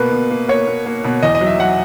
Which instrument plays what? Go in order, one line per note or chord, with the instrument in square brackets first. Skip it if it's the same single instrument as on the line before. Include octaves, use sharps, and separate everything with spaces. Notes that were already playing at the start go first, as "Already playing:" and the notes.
Already playing: [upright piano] B2 A#3 B4
B2
A#3
A#3 C#5
A#3
A#3
B2
E2 D#5
D#5
F#3
E5
F#3 F#5